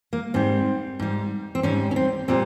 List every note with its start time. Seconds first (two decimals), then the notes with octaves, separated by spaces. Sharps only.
0.13 A#3
0.34 G#2 G3 C4
0.99 G#2 G3
1.55 C4
1.63 G#2 G3 C#4
1.91 C#4
1.96 C4
2.28 A#2 G3 C4